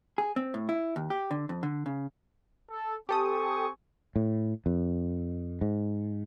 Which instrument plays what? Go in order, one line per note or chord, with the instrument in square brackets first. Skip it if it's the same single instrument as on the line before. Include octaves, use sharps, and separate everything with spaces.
[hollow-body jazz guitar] G#4
C4
A2
E4
D#2
G4
D3
F2
D3
C#3
[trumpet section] A4
[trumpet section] C4 G#5 C#6 [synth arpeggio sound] G4 A4 D#6
[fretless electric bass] A2
F2
G#2